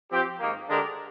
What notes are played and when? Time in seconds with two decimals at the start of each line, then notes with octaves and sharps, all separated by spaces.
0.11 F3 C4 G4
0.40 G#2 D#3 A#3
0.69 D3 G#3 D4 G4 A#4